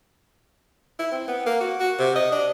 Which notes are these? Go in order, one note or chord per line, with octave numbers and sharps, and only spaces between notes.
E4
C4
B3
A#3
F#4
F#4
C3
D#5
D4